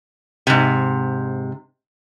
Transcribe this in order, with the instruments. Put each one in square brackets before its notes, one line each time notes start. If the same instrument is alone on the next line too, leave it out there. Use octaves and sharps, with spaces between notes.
[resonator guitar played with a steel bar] G#2 C3